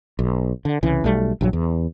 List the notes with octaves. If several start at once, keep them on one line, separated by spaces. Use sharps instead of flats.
B1
D3
C2 C#3 E3
B1 G3 A3
A#1 G2 F#3
E2